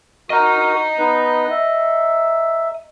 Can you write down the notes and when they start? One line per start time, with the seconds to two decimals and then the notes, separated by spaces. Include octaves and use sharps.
0.30 F#4 A#4 D#5 A#5
0.98 B3 D#4 B4
1.51 E5